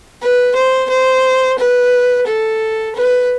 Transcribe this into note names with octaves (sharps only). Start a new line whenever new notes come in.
B4
C5
C5
B4
A4
B4